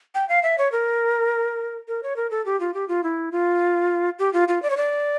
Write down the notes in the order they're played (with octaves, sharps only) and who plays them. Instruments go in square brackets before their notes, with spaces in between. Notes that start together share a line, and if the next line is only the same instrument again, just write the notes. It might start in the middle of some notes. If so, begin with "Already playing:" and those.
[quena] G5
F5
E5
C#5
A#4
A#4
C#5
A#4
A4
G4
F4
G4
F4
E4
F4
G4
F4
F4
D5
C#5
D5